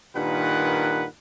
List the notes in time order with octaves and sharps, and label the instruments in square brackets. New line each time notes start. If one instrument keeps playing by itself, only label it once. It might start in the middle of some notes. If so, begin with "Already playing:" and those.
[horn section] G2 A#2 D#3 B4 F#5